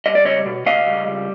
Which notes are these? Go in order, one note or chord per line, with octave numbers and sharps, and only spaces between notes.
G3 D#5
D5
C#2 C#5 D#5
B2
C#2 D#5 F5
G3
C#2